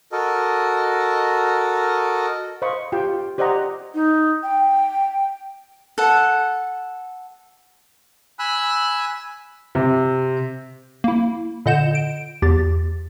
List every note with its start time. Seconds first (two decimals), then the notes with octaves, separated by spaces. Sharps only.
0.12 F#4 A4 A#4 D#5
2.62 C5 D#5 F5 B5 C#6
2.92 F4 G4 G5
3.38 G4 C5 D5 D#5 F#5 A#5
3.94 D#4
4.43 G5
5.98 A4 F#5
8.39 G#5 B5 E6 F#6
9.75 C3
11.04 A#3 E4
11.66 A#2 D3 D#5 F#5 G6 E7
11.95 D7
12.42 E2 G4 A6